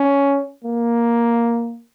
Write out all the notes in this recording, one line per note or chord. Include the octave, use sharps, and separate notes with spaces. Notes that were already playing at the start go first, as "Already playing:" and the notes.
Already playing: C#4
A#3